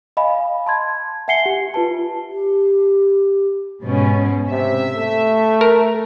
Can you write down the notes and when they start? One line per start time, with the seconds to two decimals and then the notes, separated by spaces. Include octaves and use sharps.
0.17 D#5 F5 G#5 B5
0.66 A5 C6 G#6
1.28 E5 F#5 G#5 C7 C#7 G7
1.46 G4
1.74 F4 B4 A5
2.29 G4
3.83 G#2 B2 C#4
4.50 C3 E5
4.95 A3
5.61 A#4